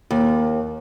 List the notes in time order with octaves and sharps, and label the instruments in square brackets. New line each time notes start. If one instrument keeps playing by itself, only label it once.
[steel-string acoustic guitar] D#2